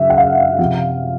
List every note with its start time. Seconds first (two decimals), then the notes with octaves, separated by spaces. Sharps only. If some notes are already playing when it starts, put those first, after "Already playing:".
Already playing: F#2 C#3 E5
0.10 F#5
0.17 F5
0.59 C3 F3